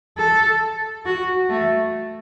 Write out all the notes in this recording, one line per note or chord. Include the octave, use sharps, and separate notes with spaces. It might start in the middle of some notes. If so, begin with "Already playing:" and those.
A4
F#4
A3